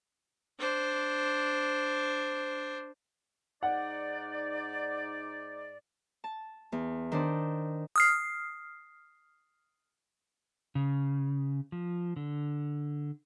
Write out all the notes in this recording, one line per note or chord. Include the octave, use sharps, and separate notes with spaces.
D4 C5
G#2 D#4 D5 F#5
A5
E2
D#3 D4 C5
D#6 F6 C7
C#3
F3
D3